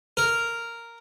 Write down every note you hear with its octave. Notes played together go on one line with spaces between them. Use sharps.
A#4